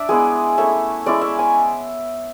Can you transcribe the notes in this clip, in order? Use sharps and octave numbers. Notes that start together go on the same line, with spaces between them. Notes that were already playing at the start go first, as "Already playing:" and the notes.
Already playing: D4 D5 E5
G#3 B3 E4 G#4
A3 C#4 E4 E5
G#3 C#4 E4 D5
E5
G#5